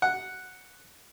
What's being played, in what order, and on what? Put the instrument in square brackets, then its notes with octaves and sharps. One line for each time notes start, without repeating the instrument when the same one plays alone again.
[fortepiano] F#5